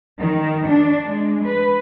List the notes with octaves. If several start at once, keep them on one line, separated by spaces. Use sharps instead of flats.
D#3
D4
G#3
B4